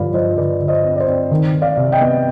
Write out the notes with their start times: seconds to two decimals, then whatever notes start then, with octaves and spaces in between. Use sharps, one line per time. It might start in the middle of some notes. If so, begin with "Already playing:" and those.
Already playing: G2 D3 F3 D5 F5 B5
0.13 F3 C5 D#5
0.37 D3 B4 D5
0.61 D3
0.68 C5 D#5
0.84 C4
0.96 D5
0.99 C5 D#5
1.07 C4
1.31 D#3
1.54 D#3
1.62 D5 F5
1.77 C3
1.92 D#5 G5
2.01 B3